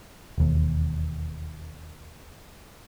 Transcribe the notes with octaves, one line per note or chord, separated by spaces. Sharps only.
E1 D#2